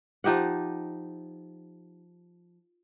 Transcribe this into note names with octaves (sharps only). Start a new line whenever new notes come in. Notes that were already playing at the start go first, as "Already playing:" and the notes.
F3 D#4 G4 F#5